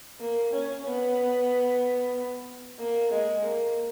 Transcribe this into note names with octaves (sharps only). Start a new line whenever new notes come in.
A#3
C#4
B3
A#3
G#3
A#3